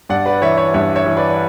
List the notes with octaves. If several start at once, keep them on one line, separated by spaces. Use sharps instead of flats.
G2 D5 F#5
B4 D5
E3 C#5 E5
C#5 E5
G2 C#5 E5
C#5 E5
E3
B4 D5
D5